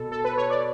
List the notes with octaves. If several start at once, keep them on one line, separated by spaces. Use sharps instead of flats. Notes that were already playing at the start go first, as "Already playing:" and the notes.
Already playing: B2 A4
A4
B4
C#5
D5